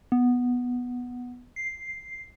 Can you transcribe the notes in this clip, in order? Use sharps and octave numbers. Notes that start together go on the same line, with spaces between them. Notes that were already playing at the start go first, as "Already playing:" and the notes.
B3
C7